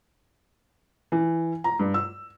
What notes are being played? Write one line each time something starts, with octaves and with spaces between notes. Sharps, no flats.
E3
A#5
G2
E6